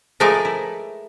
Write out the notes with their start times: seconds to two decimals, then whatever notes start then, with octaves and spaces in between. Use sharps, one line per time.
0.20 F3 G#3 A3 G#4 A#4 D5
0.45 E4